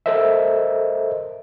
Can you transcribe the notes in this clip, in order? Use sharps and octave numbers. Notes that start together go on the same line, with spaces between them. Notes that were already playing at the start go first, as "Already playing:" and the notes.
A4 A#4 C5 D#5 E5